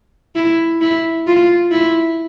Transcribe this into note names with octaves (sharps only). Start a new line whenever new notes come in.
E4
E4
F4
E4